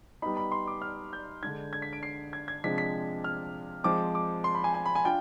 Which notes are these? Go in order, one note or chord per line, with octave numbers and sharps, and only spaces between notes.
G3 B3 D#4 B5
B5
C6
D6
F6
G6
D3 G#3 D4 G#6
G#6
B6
D7
C7
G#6
G#6
C3 F3 G#3 D4 B6
B6
F6
F3 G#3 C4 D6
D6
C6
B5
G#5
G#5
B5
G#5
D4 F4 G5